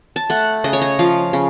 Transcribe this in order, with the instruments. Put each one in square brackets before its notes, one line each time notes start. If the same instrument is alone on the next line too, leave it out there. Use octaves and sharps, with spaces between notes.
[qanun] A5
A3 F#5
C#3 D#5
C#5
D#5
F3 F5
C#3